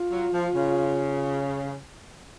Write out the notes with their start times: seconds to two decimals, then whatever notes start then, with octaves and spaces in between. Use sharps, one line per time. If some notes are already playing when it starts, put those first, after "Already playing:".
Already playing: F4
0.11 F#3
0.32 F3
0.54 C#3